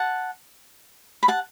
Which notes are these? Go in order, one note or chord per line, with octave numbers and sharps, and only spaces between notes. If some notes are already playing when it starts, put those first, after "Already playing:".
Already playing: F#5 A5
B5
F#5 A5